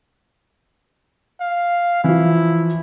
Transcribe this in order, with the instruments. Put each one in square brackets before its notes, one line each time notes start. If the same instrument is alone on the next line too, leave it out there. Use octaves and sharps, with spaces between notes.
[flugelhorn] F5
[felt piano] E3 F3 [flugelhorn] E4